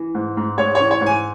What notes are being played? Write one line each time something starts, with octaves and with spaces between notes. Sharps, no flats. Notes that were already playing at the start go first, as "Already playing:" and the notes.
Already playing: E3
G#2
G#2
G#2 C#5
C#5
E3
C#5
G#2
G#5